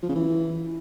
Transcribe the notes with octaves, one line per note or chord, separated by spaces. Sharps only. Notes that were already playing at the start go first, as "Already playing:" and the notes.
F3
C#3
E3